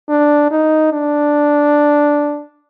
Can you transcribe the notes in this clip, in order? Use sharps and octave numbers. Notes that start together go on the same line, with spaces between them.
D4
D#4
D4